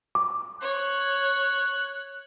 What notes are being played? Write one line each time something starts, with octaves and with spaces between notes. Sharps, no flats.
D6
C#5 F#6